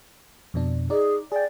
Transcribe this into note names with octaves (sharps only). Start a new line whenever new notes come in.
F2 B2 D4
D#4 G#4 D5
G#4 D5 G5